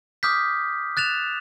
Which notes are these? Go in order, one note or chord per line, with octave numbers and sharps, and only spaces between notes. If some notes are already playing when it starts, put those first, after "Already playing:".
D6 D#6 F6 G6 B6
F#6 A6 E7 F7